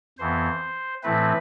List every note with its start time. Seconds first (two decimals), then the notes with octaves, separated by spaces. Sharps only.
0.19 F2 E3 B3 C5
1.03 A2 E3 A3 C4 B4